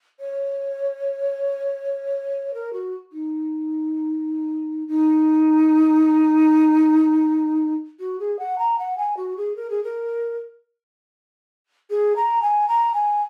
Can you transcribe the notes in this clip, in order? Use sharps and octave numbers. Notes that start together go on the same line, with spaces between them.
C#5
A#4
F#4
D#4
D#4
F#4
G#4
F#5
A#5
F#5
G#5
F#4
G#4
A#4
G#4
A#4
G#4
A#5
G#5
A#5
G#5